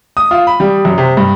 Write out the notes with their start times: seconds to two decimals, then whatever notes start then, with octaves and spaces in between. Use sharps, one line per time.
0.17 D#6
0.31 F4
0.47 B5
0.60 G3
0.85 F#2
0.98 C3
1.17 G2